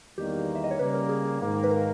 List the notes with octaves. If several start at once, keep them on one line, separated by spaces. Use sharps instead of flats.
E2 D#3 G3 A#3 G4
E5
D#5
C#5
C#3 G3 A#3 B4
A#4
G#4
G#4
G#2 D#3 A#3
B4
A#4